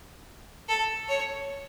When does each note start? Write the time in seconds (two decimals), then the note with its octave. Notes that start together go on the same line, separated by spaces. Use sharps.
0.69 A4
1.09 C#5